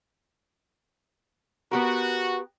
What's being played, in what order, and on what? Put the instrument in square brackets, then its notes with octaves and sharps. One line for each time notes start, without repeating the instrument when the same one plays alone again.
[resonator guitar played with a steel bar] B3 G4 A#4 [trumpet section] F#4